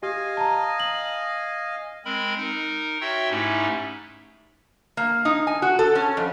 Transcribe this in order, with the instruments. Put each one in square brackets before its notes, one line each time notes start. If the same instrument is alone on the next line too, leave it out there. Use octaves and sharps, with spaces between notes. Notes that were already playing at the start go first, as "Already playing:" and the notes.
[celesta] G4 [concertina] D#5 F5 G#5
[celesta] A5 A#5
F#7
[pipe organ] G#3 C4 A#4 B5
D#4 A#4
F#4 C#5 E5 G5 C6 E6
G#2 A3 C#4 D#4 E4 G4
[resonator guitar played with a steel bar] A#3
D#4
G#5
F#4
A4
C#4
F2